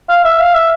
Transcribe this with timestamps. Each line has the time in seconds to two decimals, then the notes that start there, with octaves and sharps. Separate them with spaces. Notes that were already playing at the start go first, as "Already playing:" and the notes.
0.09 F5
0.24 E5
0.39 F5
0.54 E5